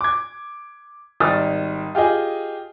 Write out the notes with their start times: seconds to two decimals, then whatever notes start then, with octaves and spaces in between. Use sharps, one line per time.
0.01 D6 G#6
1.20 G#1 D#3 G3 D#6 F6 A6
1.95 F4 G4 G#4 D#5